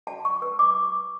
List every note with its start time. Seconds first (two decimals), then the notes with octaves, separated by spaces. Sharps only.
0.07 F#4 A5
0.25 C#6
0.42 B4 E6
0.59 D6
0.77 F#4